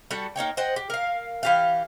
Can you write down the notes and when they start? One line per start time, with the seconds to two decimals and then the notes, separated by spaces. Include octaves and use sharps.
0.11 G3 F#4 A4
0.36 A#3 D#4 C#5 G5
0.57 C5 D#5 F#5 G5
0.76 G4
0.90 A#4 F5
1.43 E3 G4 F5